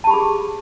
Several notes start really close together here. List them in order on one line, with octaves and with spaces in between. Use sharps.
A5 G4 B5 G#4